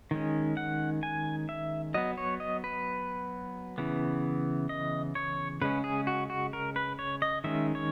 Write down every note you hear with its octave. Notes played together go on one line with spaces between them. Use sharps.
D#3 G#3 C#4
F#5
G#5
E5
F#3 B3 D#5
C#5
D#5
B4
C#3 E3 B3
D#5
C#5
C#3 G#3 C#4 B4
G#4
F#4
F#4
A#4
B4
C#5
D#5
D#3 G#3 C#4 E5
C#5